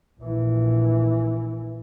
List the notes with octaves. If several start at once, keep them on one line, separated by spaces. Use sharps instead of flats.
A#1 E3